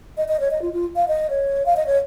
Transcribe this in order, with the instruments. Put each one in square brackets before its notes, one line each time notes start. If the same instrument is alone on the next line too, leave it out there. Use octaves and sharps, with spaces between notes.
[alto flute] D#5
D#5
C#5
D#5
F4
F4
F5
D#5
C#5
F5
D#5
C#5